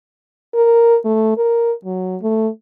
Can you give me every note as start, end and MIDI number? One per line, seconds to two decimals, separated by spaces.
0.55 0.97 70
1.05 1.36 57
1.37 1.73 70
1.85 2.17 54
2.22 2.48 57